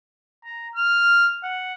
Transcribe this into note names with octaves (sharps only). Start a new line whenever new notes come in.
A#5
F6
F#5